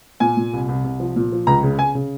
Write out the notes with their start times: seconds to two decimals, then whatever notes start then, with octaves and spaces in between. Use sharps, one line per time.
0.20 A#2 G#5
0.37 A#2
0.53 C2
0.69 C2
0.84 C2
1.00 F3
1.16 A#2
1.32 F3
1.47 C#2 A#5
1.63 C#3
1.79 C#3 G#5
1.95 C#3